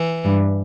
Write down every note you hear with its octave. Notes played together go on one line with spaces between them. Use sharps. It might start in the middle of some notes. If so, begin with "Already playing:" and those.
Already playing: E3
G2